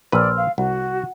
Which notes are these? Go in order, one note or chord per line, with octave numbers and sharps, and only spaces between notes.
A#1 B4 D5 C6 E6 F6
F5
C2 F#4 F#5